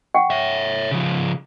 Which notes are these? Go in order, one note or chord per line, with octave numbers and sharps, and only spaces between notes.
F#5 G5 C#6
C#5 E5
C#3 F3